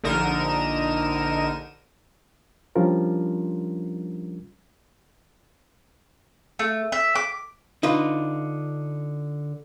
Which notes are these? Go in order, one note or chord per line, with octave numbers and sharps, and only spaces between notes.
A#1 D3 D#4 A#4 D#7 E7
F3 G3 C#4 D4 F4 A#4
A3
E5
D6
D3 D#4 F4 B4